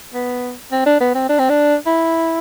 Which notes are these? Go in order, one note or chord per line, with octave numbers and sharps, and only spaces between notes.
B3
C4
D4
B3
C4
D4
C4
D4
E4